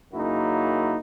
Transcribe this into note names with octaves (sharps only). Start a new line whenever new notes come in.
F#2 C#3 A#3 D#4 E4 F#4